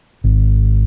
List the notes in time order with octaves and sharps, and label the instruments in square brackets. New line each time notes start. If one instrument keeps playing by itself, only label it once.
[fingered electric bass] G#1